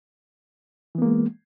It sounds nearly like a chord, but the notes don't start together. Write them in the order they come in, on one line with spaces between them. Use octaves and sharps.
E3 B3 A#3 G#3